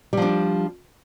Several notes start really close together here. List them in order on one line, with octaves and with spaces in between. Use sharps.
G3 F3 D4